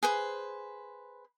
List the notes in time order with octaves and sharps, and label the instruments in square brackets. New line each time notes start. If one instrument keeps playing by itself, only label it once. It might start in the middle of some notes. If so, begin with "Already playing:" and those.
[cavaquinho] G#4 B4 C5